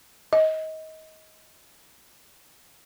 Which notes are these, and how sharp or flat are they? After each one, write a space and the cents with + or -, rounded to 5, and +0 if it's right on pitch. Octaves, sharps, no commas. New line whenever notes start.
D#5 +25